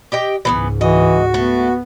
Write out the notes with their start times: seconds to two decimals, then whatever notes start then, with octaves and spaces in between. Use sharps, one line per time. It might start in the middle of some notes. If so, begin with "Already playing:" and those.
0.12 G4 D#5 G5
0.45 C#2 G#2 E3 A#3 B3
0.81 E3 F#4 D#5
1.34 A3 B3